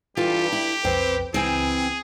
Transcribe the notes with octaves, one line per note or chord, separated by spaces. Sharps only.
G2 E3 F4 G4 A4
E4
B1 F2 C4 B4 G5
C#2 E3 C4 G#4 G5 G#5